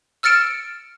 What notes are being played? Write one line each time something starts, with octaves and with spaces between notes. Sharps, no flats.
E6 F6 A6 C#7 D7 E7